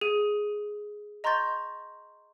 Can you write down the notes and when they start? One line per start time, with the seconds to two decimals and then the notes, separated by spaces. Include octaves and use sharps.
0.01 G#4 D#7
1.24 D#5 A#5 C6 C#6 G6 A6